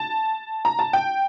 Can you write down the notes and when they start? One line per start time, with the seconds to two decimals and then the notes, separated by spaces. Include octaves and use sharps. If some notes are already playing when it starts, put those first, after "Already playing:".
Already playing: A5
0.65 A#5
0.79 A5
0.93 G5